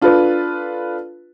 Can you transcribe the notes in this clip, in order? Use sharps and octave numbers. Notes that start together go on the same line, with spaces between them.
D4 F4 A4 B4